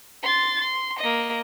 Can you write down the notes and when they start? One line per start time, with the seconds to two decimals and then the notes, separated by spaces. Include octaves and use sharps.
0.23 C6 A6
0.61 C6
0.99 A#3 D#5